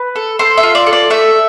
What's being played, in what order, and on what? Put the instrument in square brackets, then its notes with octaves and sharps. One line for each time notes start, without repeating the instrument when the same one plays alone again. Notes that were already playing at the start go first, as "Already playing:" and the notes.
Already playing: [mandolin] B4
A4
A4 C5
E5
F4
D5
A4
D5
A3 E5